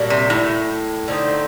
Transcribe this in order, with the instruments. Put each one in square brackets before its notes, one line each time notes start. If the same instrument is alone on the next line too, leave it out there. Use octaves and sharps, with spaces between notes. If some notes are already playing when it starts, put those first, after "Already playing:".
Already playing: [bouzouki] A#2 G3 D4 F#4
[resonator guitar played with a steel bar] C3
A2
[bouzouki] D3 A3 C4 D#4